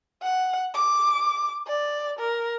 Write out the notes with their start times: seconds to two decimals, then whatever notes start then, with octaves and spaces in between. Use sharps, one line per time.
0.22 F#5
0.74 D6
1.67 D5
2.19 A#4